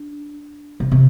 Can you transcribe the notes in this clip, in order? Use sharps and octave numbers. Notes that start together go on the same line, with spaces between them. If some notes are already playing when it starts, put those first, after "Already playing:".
Already playing: D4
C3
C3